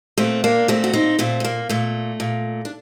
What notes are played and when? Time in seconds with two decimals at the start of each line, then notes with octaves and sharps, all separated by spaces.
0.17 A#2 A3 C4
0.44 A#3 D4
0.68 A#2 A3 C4
0.84 F#4
0.93 C4 D#4
1.19 A#2 A3 C4
1.40 A3
1.44 A#3
1.69 A#2 A3
2.20 A#2
2.65 D4